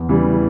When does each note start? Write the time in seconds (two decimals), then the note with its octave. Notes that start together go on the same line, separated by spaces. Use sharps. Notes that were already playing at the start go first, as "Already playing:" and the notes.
Already playing: E2
0.09 C#3 E3 G3